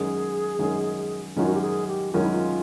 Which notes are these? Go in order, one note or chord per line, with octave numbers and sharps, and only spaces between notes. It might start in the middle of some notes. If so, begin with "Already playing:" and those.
Already playing: F#2 D#3 G#3 C#4 G#4
F#2 D#3 G#3 C#4
F#2 D#3 G#3 C#4 F4
F#4
G4
G#4
G4
F#2 D#3 G#3 C#4 F4
E4
F4